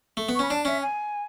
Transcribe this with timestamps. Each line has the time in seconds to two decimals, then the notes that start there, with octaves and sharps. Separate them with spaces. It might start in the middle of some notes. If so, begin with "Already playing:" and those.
0.17 A3
0.29 B3
0.35 C#6
0.39 C#4 B5
0.50 D4 A5
0.65 C#4 E5
0.81 G#5